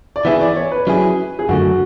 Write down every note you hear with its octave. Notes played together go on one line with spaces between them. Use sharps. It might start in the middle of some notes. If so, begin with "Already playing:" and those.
D5
E3 B3 E4 G#4 E5
D5
C#5
B4
F#3 C#4 E4 G#4
G#4
F#2 D3 A3 F#4